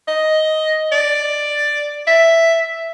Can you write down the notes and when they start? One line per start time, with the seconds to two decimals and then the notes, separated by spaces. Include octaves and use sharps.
0.08 D#5
0.92 D5
2.07 E5